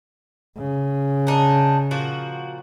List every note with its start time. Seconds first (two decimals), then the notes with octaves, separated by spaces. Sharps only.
0.57 C#3
1.27 D4 D#4
1.91 A#2 F3 F#4